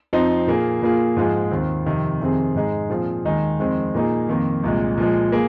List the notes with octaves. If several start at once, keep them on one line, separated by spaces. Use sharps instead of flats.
F2 F3 C4 D#4
A#2 A#3 G#4
A#2 A#3 F4 G#4
G#2 F3 G#3 F4 G#4
D#2 D#3 C4
F2 C3 D#3
F2 C3 D#3 C4 G#4
G#2 G#3 D#4 G#4
A#2 F3 C4 F4 G#4
D#2 D#3 G#3 D#4 G#4
F2 D#3 G#3 C4
A#2 A#3 D#4 G#4
F2 D#3 A#3
C2 A#2 G#3
A#2 F3 G#3
A#3 G#4